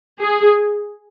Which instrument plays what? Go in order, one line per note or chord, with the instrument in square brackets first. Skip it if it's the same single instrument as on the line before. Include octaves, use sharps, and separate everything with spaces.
[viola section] G#4